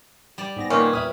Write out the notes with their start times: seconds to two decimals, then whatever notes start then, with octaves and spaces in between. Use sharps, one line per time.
0.38 G3 D5
0.56 G#2 B3 A#6
0.70 A#2 D#3 A#3 C#4 B4 F5
0.93 E2 A#2 E4 B5 D#6 F6